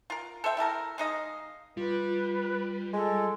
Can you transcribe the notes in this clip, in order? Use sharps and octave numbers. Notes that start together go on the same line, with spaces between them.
F4 A#4
A4 C5 E5 G5
E4 G4 A4 A#4
G#3 D#4 D#5 F5
G3 F4 B4
G#3 A4